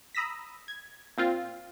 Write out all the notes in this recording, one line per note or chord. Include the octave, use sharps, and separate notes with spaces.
A#5 B5 D#6 E6 A#6 B6
G#6
A#2 C4 F4